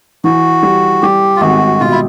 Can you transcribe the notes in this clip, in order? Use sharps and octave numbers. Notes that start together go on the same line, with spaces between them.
E3 F#4
G3
G3 G4
F4
G#1 F#4
B2 F4
E4